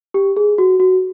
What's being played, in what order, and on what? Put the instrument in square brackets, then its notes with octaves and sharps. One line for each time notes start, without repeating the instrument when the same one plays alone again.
[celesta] G4
G#4
F#4
F#4